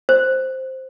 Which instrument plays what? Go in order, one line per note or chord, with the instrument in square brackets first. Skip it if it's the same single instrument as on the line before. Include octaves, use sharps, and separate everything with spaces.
[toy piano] C5